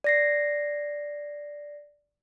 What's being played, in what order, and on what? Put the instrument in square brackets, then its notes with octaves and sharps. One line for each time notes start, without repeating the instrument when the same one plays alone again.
[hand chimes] D5 A#6 C7